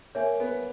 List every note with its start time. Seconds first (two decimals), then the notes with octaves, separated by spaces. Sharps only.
0.15 A#3 C#5 E5 G#5
0.40 B3